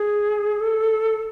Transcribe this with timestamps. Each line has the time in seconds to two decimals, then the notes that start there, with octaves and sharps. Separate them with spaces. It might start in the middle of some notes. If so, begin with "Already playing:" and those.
Already playing: G#4
0.60 A4